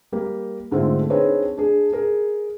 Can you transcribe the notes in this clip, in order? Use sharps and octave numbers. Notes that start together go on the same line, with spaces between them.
G3 A#3 G4
G#2 D3 A3 C4 F4
C4 D4 D#4 G#4 B4 C#5
D4 G#4
G#4 A#4